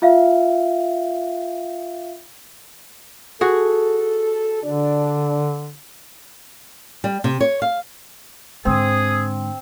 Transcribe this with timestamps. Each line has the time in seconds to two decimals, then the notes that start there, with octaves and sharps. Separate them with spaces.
0.02 F4 E5 F5
3.41 F#4 G#4 A4
4.63 D3 D4 D5
7.04 G3
7.24 C3
7.41 C#5
7.62 F5
8.65 G#2 D3 C4 G#4 D#6